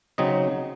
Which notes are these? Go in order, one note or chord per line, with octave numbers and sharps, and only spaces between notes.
C#3 F#3 C4 D#4 D#5